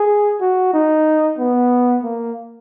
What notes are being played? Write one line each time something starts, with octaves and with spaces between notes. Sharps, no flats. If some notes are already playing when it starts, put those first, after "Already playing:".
Already playing: G#4
F#4
D#4
B3
A#3